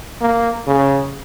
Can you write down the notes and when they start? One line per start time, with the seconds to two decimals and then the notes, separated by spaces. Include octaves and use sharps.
0.21 A#3
0.67 C#3